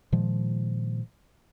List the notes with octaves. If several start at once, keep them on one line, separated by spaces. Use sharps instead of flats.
A#2 D#3 F3 G#3